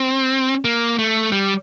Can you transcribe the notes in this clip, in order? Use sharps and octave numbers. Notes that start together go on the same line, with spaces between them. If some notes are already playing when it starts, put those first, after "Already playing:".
Already playing: C4
A#3
A3
G3